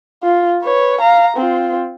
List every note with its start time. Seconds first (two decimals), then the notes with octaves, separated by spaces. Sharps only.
0.24 F4
0.63 B4 C#5
1.01 F5 A#5
1.37 C4 F4